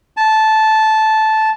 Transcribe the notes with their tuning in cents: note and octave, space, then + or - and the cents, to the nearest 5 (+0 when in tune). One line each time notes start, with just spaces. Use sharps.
A5 -10